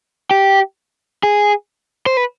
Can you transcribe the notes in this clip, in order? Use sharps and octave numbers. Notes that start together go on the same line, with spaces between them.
G4
G#4
C5
B4